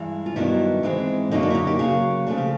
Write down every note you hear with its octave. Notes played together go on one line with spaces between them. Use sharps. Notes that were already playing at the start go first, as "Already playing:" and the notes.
Already playing: G2 E3 G#3
F4
G2 D#3 F#3 B3 D4 E4
G#2 E3 G#3 C4
F#2 D3 F#3 A#3 D#4
D4
E4
D#4
G4
C#3 F#3 A#3 G#4
C#3 F3 A3 D4 G#4
G4